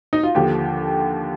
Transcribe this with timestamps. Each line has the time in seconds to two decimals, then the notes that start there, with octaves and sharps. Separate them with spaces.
0.13 D#4
0.23 F4
0.35 D#2 D3 F3 G4